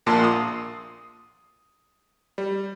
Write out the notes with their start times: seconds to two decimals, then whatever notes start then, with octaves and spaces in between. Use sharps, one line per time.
0.06 A#1 A#2 A#3 A5 C6 C7
0.24 D#6
2.38 G3